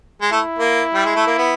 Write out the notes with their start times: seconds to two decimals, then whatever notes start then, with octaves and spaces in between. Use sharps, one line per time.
0.21 G#3
0.31 A3 E4
0.59 A#3
0.94 G3
1.05 G#3
1.16 A3
1.27 A#3
1.38 B3